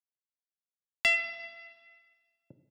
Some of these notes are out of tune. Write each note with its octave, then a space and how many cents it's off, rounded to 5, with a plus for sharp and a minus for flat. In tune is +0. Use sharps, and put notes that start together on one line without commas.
E5 +35